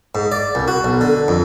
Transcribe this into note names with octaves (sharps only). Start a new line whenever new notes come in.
G#2
D5
C2
F#4
B1
D3
F2